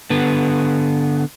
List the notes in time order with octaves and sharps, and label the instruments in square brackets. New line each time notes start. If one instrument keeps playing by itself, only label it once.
[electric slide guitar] D3 B3